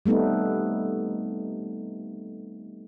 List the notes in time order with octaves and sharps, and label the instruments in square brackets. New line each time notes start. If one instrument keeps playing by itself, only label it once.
[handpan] G3 A3 B3 C4 D#4